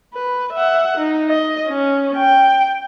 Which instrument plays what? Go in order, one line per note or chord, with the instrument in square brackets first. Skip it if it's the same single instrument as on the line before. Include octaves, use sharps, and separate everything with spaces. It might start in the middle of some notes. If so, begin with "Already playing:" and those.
[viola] B4
E5 F#5
D#4
D#5
C#4
G5